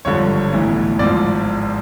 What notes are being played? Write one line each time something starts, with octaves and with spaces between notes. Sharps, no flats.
G#1 G2 D3 F3 C#5
B1 A2 E3
G#1 G#2 F3 D5